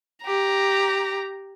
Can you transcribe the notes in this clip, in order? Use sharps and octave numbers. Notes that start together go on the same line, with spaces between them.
G4 A#5